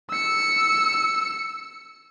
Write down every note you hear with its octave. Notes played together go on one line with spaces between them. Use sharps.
E6 C#7